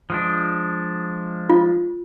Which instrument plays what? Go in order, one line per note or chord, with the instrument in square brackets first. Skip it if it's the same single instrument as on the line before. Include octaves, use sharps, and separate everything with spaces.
[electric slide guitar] F3 G#3 D4
[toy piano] F4